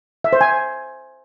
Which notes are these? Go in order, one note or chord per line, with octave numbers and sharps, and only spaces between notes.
E5
C5
G#5